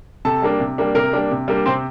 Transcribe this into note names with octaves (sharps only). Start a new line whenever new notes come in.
C3 A4 A5
G3 A#3 D4
C3
G3 A#3 D4
C3 A#4
G3 A#3 D4
C3
G3 A#3 D4
C3 C4 C5